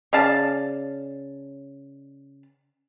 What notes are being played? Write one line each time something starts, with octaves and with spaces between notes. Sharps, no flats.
C#3 D5 F5 A5